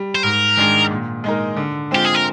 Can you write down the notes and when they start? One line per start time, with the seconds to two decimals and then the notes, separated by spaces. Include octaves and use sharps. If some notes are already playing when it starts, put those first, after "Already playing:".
Already playing: G3
0.15 C5
0.23 G#2 A#4
0.57 D#3 G#3 D4 G#4
0.91 A#2
1.24 G#3 D#4 A#4
1.56 D3
1.91 G#3 C4 F4 G4
2.05 G#4
2.15 A#4